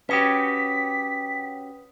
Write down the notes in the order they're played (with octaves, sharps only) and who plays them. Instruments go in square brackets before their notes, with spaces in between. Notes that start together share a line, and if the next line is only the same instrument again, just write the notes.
[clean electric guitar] C#4 F#4 G4 [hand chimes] B4 C#5 D#6 [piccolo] B6